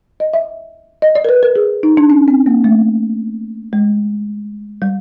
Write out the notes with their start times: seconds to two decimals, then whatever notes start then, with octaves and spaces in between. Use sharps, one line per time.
0.20 D#5
0.34 E5
1.02 D#5
1.15 D5
1.25 A#4
1.29 B4
1.43 A#4
1.56 G#4
1.83 D#4
1.97 D4
2.10 C#4
2.28 C4
2.46 A#3
2.64 A3
3.73 G#3
4.82 G3